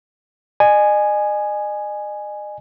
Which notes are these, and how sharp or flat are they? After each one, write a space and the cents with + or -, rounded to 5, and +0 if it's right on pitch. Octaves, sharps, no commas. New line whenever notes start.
D#5 -40 G#5 +0